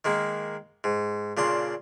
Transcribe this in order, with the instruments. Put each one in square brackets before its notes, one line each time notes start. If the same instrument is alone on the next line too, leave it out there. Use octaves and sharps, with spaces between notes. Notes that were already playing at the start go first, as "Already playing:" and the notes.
[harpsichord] D#3 G#3 A#3
G#2
A#2 C#3 D4 C6